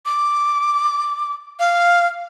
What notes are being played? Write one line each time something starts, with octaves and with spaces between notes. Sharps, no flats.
D6
F5